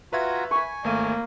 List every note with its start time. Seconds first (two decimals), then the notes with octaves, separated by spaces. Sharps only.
0.13 F4 F#4 B4 E5 A#5 G#6
0.51 G#5 B5 C#6
0.84 G#1 A3 A#3 D#7